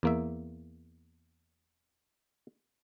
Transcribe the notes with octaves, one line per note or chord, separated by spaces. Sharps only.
E2 A#3 E5